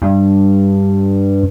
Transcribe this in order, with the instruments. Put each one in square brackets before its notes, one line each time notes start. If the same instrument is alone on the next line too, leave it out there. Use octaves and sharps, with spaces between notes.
[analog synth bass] G2